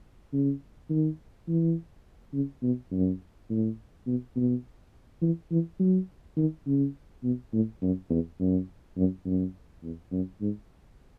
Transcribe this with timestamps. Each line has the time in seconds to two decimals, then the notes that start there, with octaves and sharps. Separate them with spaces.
0.33 C#3
0.90 D#3
1.48 E3
2.33 C#3
2.63 B2
2.92 F#2
3.50 A2
4.07 B2
4.36 B2
5.22 E3
5.51 E3
5.80 F#3
6.37 D#3
6.66 C#3
7.23 B2
7.53 A2
7.82 F#2
8.10 E2
8.40 F#2
8.97 F#2
9.26 F#2
9.83 E2
10.12 F#2
10.41 G#2